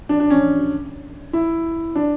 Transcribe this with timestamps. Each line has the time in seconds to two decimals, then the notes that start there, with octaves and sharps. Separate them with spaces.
0.09 D4
0.20 D4
0.30 C#4
1.33 E4
1.95 D4